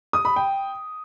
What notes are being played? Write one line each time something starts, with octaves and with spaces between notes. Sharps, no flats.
D#6
B5
G5